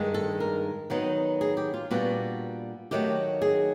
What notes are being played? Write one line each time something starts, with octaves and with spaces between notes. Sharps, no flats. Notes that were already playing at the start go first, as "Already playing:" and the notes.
Already playing: G2 D#3 G#3
A4
A#4
D#3 F#3 B3 D#4
G#4
G4
F4
A#2 G3 B3 D4 F#4
D#3 F#3 A3 G4
G#4